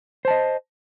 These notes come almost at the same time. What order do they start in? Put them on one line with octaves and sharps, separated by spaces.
C5 A5 D#5